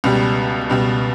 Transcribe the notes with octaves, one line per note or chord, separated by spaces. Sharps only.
C#2 B2 G3
C#2 B2 G3